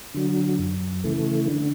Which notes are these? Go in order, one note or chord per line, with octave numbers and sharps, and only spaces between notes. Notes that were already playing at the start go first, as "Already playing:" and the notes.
D3 F#3
F#2
C#3 E3 A3
D3